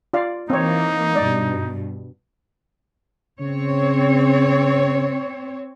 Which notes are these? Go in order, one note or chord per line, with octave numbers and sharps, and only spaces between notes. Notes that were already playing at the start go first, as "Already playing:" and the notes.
F4 D5 F5
E3 A#3 C4 D#4 C#5
G2 B2 D5
C#3 C4 C#5